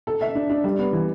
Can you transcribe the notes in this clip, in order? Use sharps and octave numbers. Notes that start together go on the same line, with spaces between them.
A4
E5
D4
D4
G3
B3
E3